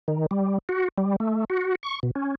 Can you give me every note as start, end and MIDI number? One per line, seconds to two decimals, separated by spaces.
0.08 0.26 51
0.31 0.58 55
0.69 0.88 66
0.98 1.16 55
1.20 1.45 57
1.50 1.75 66
1.83 2.00 85
2.03 2.11 47
2.15 2.35 61